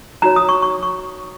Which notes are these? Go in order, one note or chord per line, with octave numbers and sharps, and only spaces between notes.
D#4 F#4 C#5 A#5
D#6
C#6
C#6
C#6